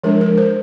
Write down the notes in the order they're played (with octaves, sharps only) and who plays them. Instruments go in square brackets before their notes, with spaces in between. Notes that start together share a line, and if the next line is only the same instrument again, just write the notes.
[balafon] F3 G#3 D4 A#4
A#4
C5